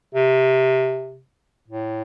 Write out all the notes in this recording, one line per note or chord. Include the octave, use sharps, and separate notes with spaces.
C3
A2